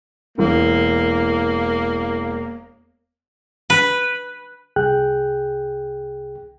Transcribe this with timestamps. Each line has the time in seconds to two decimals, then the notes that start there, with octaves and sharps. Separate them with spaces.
0.38 E1 E3 A#3
3.70 B4
4.76 C2 G#4 G5 F#6